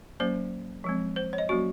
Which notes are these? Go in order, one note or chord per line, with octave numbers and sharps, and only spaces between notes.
F#3 A#3 C#4 C5
F3 G#3 C4
C5
C#5
D#5
F#3 A#3 C#4 F#4